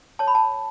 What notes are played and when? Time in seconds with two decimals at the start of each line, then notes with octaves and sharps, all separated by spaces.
0.19 C#5 A5
0.28 B5
0.35 A5